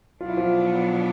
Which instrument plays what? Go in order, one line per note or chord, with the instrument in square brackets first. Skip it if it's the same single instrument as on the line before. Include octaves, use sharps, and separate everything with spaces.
[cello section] B2 F#3 B3 D4 [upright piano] F4
[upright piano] E4
F3 F4